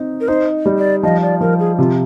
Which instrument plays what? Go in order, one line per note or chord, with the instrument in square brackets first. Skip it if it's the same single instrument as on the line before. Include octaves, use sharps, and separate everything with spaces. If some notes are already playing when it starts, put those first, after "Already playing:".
Already playing: [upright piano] C4 D#4
[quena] A#4
[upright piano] D#4 [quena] C5
[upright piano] G3
[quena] D5
[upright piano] F3 [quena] D#5
[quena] D5
[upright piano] F3 [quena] A#4
[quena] G#4
[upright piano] C3 [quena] F4